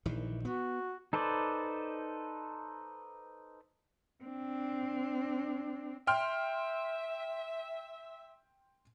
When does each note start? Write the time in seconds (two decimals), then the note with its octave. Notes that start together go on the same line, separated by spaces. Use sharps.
0.06 A#1 D#3 E3
0.45 B3 F#4
1.13 D#4 A4 B4 C5 D5
4.24 C4 D4
6.07 E5 G5 C6 F6